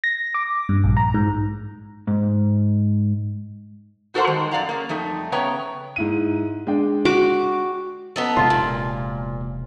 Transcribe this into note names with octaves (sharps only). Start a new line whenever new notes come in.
A#6
D6
G2
A#1
A#5
G#2
G#2
D#4 F#4 A4 A#4 C5 F#5
D#3 G3 G#3
F#2 D5 F5 F#5 A#5
C#3 A#3
F2 G3 A3 D#4
C#3 B3 C#5 G5 A#5
G#2 E4 D#7
G#3 D4 G5
F#4 D6
B3 D#4 A4
E1 C3 G#3 F4
A#2